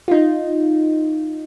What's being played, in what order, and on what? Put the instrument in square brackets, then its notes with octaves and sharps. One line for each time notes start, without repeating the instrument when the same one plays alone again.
[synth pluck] D#4 F4